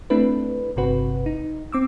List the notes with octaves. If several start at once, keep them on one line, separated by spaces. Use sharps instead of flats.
A3 C4 D4 E4 B4
G1 C3 C4 F#4 B4
D#4
C4 D6 E6